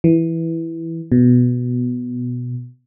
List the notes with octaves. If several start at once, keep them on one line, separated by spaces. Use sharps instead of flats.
E3
B2